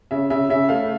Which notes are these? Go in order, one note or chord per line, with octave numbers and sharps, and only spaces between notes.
C#3 E5
C#3 E5
C#3 E5
A3 F5